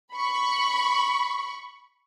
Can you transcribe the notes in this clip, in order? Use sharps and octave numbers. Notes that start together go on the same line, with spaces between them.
B5 C#6